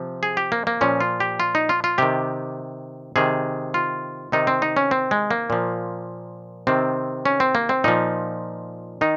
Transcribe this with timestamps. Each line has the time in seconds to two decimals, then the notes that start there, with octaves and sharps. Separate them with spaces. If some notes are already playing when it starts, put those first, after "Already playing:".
Already playing: C3 F3
0.23 G#4
0.37 G4
0.52 A#3
0.67 A#3
0.81 A#2 F3 C#4
1.01 F4
1.20 G4
1.40 F4
1.55 D#4
1.69 F4
1.84 F4
1.98 C3 D#3 G4
3.16 C3 D#3 G#4
3.74 F4
4.32 C3 D#3 D#4
4.47 C4
4.62 D#4
4.77 C#4
4.91 C4
5.11 G#3
5.31 A#3
5.50 A#2 F3
6.67 C3 D#3 C4
7.25 C#4
7.40 C4
7.55 A#3
7.69 C4
7.84 A#2 F3 D#4
9.01 D#3 D#4